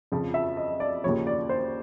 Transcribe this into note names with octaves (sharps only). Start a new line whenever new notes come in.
F2 C#3 F3
E5
D#5
D5
D#2 C#3 F3 C#5
D5
C5